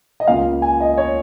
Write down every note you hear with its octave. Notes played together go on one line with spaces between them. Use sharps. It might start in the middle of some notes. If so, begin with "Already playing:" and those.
D#5
C#2 C#3 A#3 F4 F5
G#5
D#5
C#5